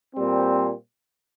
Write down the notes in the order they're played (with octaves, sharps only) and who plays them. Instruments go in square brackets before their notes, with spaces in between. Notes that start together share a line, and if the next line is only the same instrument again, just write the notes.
[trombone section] A#2 G3 C4